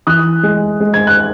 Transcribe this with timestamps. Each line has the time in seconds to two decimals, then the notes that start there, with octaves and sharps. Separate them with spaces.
0.07 E3 D#6 F#6
0.43 G#3
0.80 G#3
0.94 G#6
1.07 F#6